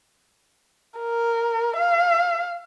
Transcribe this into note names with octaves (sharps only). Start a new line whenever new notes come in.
A#4
F5